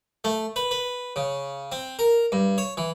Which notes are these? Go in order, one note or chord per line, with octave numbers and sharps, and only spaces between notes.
A3
B4
B4
C#3
C4
A#4
G2
C#5
E3